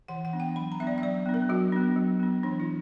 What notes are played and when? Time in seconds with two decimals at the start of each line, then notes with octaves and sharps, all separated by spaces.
0.08 E3 F#5
0.25 F#5
0.33 B3 D4
0.40 G5
0.56 F#3 B5
0.72 A#5
0.80 B3 E5
0.83 D4 D5
0.98 E5
1.02 F#3 D5
1.26 B3 D4
1.34 A#4
1.49 F#3 F#4
1.73 B3 D4
1.96 F#3
2.20 B3 D4
2.43 E3 D4
2.60 E4